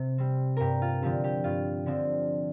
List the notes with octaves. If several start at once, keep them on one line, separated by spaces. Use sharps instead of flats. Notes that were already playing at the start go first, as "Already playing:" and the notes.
Already playing: C3
G3 C4
G2 G4 A#4
F4
D3 F3 C4 G4
G4
G2 F4
D3 F3 C4